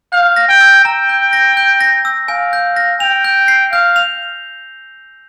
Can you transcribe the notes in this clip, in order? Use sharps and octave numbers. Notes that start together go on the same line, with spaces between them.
F5 G6
A#6
G5
E6
G5 A#5
G6
A#6
G6
A#6
E6
F5 G#5
G6
A#6
G5 F7
G6
C7
F5 G6
F7